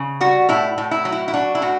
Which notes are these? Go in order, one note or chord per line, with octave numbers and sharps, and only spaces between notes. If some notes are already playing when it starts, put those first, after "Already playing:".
Already playing: C#3
G3 F#4
A2 E4
A2
E4
F#3
E4
E4
D4 F#4
E4
A2 F#4